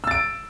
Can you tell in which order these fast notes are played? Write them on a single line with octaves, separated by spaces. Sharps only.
E6 A6 D7